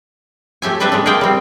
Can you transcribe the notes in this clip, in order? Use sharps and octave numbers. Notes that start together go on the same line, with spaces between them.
A3 G4 E5 G#5
C4 D4 B4 E5 G5 A5
G#3 A3 D4
G#4 A#4 D5 G5 A5
G3 C4